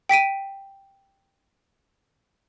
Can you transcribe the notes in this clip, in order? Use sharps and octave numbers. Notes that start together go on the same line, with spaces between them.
G5 B6 D7 D#7